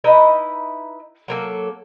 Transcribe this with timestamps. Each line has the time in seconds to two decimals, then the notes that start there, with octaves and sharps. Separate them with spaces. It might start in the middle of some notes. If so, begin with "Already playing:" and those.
0.04 D#4 E4 B4 D#5
1.28 F#3 A#3 A4